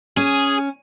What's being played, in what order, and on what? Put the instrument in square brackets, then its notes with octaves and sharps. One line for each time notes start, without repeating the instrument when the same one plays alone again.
[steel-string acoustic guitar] C#4 [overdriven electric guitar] G#4